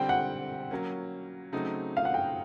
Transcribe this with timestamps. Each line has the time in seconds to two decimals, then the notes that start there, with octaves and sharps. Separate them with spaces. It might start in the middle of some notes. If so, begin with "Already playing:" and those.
Already playing: D3 G3 C4 G5
0.09 F#5
0.71 F#3 A#3 C#4
1.52 C#3 F#3 A3 C4 D#4
1.97 F5
2.05 F#5
2.14 G5